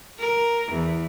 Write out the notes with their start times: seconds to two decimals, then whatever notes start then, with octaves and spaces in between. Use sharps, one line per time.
0.19 A#4
0.72 E2